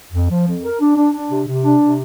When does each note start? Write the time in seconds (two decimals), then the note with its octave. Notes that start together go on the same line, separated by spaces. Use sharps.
0.13 F2
0.30 F3
0.47 F2
0.63 A#4
0.80 D4
0.96 D4
1.14 D4
1.31 C3
1.47 C3
1.65 D4
1.81 C3